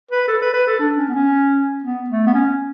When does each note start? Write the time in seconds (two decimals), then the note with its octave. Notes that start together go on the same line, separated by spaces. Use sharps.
0.11 B4
0.28 A4
0.42 B4
0.53 B4
0.67 A4
0.79 D4
0.97 C#4
1.09 B3
1.15 C#4
1.84 B3
2.09 A3
2.27 B3
2.34 C#4